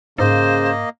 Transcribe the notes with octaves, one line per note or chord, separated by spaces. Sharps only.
G#2 C#3 A#3 C5 D#5